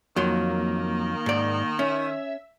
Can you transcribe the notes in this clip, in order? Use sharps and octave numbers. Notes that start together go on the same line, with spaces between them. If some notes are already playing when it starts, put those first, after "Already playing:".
F2 D#3 F#3 A#3 C6
G#2 D5
C#4 E5